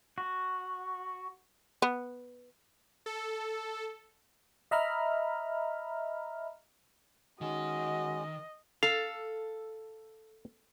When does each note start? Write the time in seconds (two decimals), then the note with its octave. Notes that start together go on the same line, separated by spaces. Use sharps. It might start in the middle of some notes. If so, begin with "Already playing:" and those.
0.18 F#4
1.82 B3
3.06 A4
4.71 D#5 E5 A#5 B5 F6
7.41 D#3 G#3 C#4 F#4 D#5
8.83 A4 F5